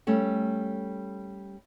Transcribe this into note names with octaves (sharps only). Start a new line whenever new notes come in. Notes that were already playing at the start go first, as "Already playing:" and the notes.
G3 A3 C#4